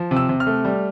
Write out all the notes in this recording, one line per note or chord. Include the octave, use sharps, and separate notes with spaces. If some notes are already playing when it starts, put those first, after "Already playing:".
Already playing: F3
C3
E6
C3
F6
A3
G3